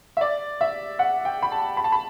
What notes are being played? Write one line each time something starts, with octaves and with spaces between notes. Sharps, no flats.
E5
D5
E5
F#5
G5
B5
A5
B5
A5
B5